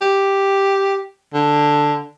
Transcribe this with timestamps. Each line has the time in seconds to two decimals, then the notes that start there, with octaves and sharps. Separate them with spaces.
0.01 G4
1.34 D3